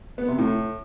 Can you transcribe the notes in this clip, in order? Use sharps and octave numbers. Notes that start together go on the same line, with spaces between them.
B3
C3
A2